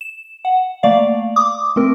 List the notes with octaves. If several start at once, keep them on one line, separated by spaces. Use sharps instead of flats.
E7
F#5
A3 A#3 D5 F5
D6 D#6
A3 C4 A#4